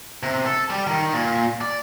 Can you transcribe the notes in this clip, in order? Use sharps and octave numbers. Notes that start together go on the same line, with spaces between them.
C3
A4
G3
D#3
A#2
D5